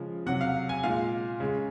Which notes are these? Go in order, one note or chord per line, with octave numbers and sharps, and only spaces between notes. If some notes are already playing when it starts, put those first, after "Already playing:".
Already playing: C#3 F3 G#3
C3 F#3 F#5
F5
G#5
A#2 G#3 F5
C#3 G#3